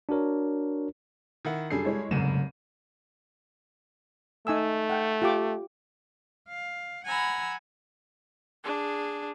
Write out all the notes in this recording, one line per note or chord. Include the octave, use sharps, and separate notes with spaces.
D4 F#4 A#4 C#5
D#3 E4 F#5
F#2 G3 D4 G#4 A4 C7
G#3 E4 C#5
F1 C2 G#2 C#3 F#3 A3 D#7 E7
A3 D#4 G#5 E6
F#5 G5
F4 G4 D6
F5
F#5 G#5 A#5 B5 E6
D4 G#4